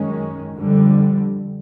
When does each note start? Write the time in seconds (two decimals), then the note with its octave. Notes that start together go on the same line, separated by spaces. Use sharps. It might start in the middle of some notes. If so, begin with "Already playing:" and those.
Already playing: F#2 D#3 G#3 C#4
0.56 F2 D3 G3